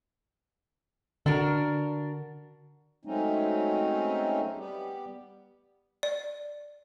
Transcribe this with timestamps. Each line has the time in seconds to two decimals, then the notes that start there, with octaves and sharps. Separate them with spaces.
1.26 D3 D4 F#4 A#4
3.05 F#3 G#3 A3 C4 C#4 D#4
4.57 G3 B3 G4
6.03 D5